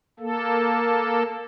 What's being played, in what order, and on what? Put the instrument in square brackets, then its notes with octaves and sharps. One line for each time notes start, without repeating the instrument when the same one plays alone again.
[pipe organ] A#3 A4